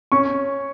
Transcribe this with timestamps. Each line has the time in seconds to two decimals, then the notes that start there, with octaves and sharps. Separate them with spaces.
0.12 C#4 C#6